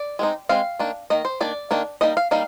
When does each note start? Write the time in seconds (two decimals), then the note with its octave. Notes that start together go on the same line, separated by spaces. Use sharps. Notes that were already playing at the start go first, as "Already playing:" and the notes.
Already playing: D5
0.19 G#3 C4 D#4
0.49 G#3 C4 F5
0.79 D#3 A#3 D4
1.10 D#3 A#3 D#5
1.25 C5
1.41 D#3 A#3 D4 D5
1.71 D#3 A#3 D4
2.01 G3 A#3 D#4 D#5
2.17 F5
2.31 G3 A#3 D#4 F5